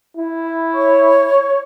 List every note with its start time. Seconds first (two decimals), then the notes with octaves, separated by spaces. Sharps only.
0.17 E4
0.74 C#5 C#6